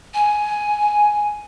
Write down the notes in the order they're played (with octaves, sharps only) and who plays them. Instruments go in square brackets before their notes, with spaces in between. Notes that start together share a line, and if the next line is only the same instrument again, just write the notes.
[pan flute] G#5